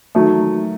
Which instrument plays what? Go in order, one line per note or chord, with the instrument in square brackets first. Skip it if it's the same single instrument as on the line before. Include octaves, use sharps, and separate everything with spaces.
[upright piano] D#3 F#3 A3